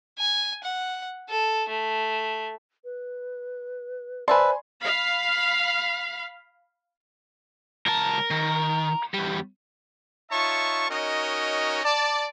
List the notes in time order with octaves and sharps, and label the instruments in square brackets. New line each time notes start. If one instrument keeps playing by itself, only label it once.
[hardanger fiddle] G#5
F#5
A4
A3
[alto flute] B4
[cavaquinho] B4 E5 A5 [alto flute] C5 [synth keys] D5 B5 [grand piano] G#5 C6
[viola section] F5 B5
[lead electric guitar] C#2 A5 [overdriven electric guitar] A#4
[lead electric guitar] D#3
E2 G3
[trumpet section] D#4 F4 C#5 E5 A5 C#6
C#4 D#4 F#4 A#4 C#5 D#5
D5 A5